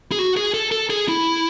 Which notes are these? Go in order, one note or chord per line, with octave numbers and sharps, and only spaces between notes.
G#4
F#4
G#4
A4
A4
G#4
E4